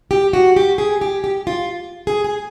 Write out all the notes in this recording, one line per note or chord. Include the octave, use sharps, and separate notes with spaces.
G4
F#4
G4
G#4
G4
G4
F4
G#4
G#4